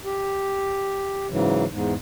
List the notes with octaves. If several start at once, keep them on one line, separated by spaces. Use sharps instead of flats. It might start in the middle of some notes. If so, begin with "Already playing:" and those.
G4
G#2 C#3 E3 F#3
E2 G#2